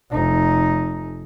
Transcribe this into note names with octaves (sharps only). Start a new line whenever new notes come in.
F1 D#4